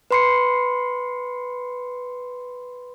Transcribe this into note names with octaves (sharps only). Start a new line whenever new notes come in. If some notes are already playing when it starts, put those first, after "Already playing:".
B4 B5 C6 C7 C#7